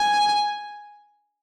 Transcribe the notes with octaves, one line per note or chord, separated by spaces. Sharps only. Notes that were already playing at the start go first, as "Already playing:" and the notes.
Already playing: G#5